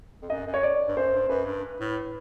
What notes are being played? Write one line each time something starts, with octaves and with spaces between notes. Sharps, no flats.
F2
F#2 D#5
F#2
C#5
D5
G2
F#2 C5
G2
F#2 B4
G2
A2